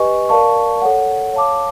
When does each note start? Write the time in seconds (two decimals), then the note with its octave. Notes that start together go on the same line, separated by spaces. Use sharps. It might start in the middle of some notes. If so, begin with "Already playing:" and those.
Already playing: G4 B4 D#5 G#5 C#6
0.29 A#4 D5 F5 A5 C#6
0.82 A4 C#5 F#5
1.33 C#5 F5 A5 D6